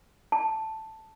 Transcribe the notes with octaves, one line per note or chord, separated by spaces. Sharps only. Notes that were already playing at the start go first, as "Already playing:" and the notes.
A5